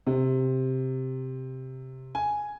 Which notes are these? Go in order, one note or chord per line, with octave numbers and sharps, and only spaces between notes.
C3
G#5